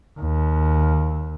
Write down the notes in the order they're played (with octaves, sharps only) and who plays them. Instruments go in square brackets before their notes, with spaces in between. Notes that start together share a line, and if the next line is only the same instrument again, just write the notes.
[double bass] D#2